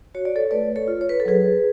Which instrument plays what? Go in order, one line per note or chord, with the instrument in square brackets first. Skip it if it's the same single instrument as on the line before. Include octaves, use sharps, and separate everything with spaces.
[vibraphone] F#4 C#5
D5
A4 C#5
A3 B4 D5
A4 C#5
F4
C#5
B4
A4
F#3 G#4 B4